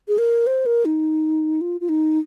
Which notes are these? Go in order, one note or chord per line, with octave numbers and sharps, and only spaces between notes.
G#4
A#4
C5
A#4
D#4
F4
F4
D#4